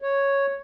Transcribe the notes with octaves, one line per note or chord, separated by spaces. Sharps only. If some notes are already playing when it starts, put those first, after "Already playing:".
C#5